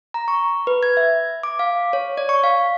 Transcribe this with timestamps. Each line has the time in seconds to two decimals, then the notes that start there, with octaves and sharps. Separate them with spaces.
0.14 A#5
0.28 C#6
0.67 B4
0.83 G#6
0.97 E5
1.43 D6
1.59 F5
1.93 C#5
2.17 D5
2.29 C#6
2.44 F5